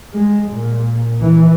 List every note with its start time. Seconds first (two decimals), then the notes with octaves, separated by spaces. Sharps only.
0.16 G#3
0.51 A#2
1.20 E3